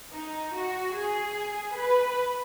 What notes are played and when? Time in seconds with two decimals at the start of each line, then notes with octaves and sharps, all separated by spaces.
0.14 D#4
0.54 F#4
0.95 G#4
1.76 B4